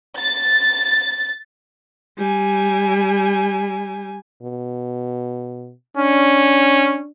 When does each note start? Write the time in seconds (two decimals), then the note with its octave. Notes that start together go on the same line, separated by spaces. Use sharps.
0.19 A6
2.18 G3 G#5
4.42 B2
5.97 C#4 D4